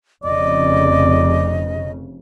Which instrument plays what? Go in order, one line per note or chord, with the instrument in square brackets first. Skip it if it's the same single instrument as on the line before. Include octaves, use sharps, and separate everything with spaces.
[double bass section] F1 F2 C#3 [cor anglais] D5 [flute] D#5